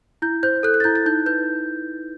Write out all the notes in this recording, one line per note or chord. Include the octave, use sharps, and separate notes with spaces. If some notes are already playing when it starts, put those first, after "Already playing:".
E4 G6
C5 G6
A4 F#6
F#6
A6
E4 G6
A6
D#4 G6
B4 G6